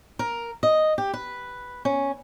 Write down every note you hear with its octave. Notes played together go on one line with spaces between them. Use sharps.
A#4
D#5
G4
B4
C#4